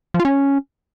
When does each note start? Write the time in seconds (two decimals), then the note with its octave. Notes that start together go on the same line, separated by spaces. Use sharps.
0.14 F3
0.20 F4
0.25 C#4